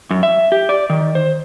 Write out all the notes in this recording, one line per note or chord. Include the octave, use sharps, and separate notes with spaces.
F#2
E5
G4
D5
D#3
C5